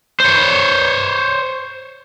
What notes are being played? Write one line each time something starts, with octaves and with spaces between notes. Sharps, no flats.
C5 C#5